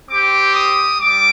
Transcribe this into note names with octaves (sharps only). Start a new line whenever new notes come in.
C4 G4 D6
D#6
G3 D6